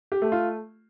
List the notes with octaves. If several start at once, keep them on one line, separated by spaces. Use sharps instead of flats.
G4
A3
F4